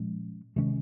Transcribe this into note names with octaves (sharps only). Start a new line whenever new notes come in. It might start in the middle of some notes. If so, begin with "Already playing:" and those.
Already playing: A#2 F3 G#3 C#4
C3 D#3 G#3 C#4